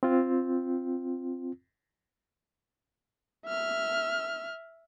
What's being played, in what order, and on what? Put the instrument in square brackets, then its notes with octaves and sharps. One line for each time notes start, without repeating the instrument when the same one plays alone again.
[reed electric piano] C4 F4
[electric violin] E5 F6